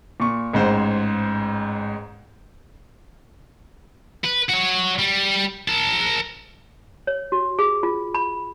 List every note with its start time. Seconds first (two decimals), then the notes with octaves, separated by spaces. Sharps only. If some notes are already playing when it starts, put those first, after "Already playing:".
0.20 A#2 C#6
0.53 A1 G#2 C5
4.25 B4
4.49 F#4 C#5
4.99 G3
5.68 A#4 A5
7.07 C#5
7.32 F#4
7.59 G#4
7.83 F4
8.14 B5